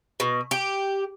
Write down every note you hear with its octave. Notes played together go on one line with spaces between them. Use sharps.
B2
G4